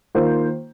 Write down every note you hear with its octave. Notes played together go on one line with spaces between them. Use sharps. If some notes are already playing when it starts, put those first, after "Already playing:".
D#3 A#3 F4 C5